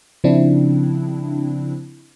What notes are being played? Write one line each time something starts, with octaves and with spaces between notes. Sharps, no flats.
C#3 F3 C4 D4 E4